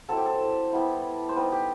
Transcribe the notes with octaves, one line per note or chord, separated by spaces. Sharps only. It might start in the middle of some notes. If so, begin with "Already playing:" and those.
F#3 C4 E4 A4
G4
A4
G3 B3 E4
C5
G3 B3 D#4 B4
G4